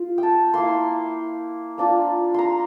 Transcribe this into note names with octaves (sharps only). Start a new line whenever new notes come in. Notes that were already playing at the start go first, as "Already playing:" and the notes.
Already playing: F4
G5 A5
A#3 E4 C6
A#3 D4 F4
A#5 C6